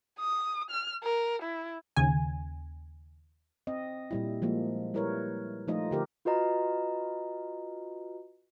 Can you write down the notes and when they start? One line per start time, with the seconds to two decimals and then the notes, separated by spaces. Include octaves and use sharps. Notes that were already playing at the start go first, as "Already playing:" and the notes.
0.20 D#6
0.70 F6
1.03 A#4
1.42 E4
1.96 D#2 C#3 G#5
3.67 C4 D#5
4.11 A#2 G3 E4
4.42 F3 G#3 A#3
4.94 G3 E4 A#4 B4 C#5
5.68 F3 A3 D#4 F4 D#5
5.91 D3 G4 A#4
6.25 F4 F#4 B4 D#5 A#5